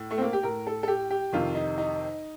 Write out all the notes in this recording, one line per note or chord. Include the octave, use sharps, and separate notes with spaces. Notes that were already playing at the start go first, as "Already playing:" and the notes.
Already playing: A2
A3
C4
A#3
G4
A2 A#4
A4
A4
G4
G4
F2 C3 D#3 F4
D#4
D#4